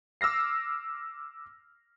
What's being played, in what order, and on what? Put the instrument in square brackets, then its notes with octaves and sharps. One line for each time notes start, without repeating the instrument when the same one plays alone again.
[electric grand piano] D6 E6 F6 A#6 C7